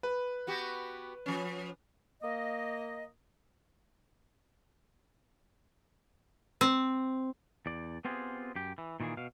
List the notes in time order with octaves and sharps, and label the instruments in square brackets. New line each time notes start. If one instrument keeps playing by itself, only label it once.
[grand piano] B4
[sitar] B3 F#4 G4
F3 C#4
[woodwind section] A#3 D#5
[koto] C4
[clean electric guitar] E2 D5
B3 C4 F4 G4 G#4
F#2 G4
E3
A#2 D#3 E3 A#3 G#4
B2 F5